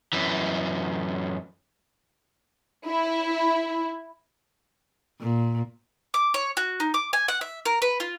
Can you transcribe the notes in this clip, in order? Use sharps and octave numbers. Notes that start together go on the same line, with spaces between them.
F#2 E3
E4
A#2
D6
C#5
F#4
D#4
D6
G#5
F#5
E5
A#4
B4
F4